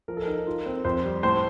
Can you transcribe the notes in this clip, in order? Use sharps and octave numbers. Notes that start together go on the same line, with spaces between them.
F3 A#4
A4
D#4 A#4
F4
C4
F2 C5
G3
A2 C5